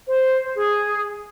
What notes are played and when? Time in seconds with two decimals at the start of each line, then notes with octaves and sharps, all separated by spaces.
0.07 C5
0.55 G#4